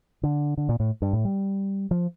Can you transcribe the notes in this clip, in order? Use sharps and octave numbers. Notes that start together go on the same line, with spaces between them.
D3
D3
A#2
A2
G2
A2
G3
F3